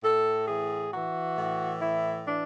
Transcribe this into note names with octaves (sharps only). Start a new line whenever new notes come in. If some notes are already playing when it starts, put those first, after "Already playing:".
A2 A4
E3 G#4
E3 F#4
A2
E3 E4
E3 D4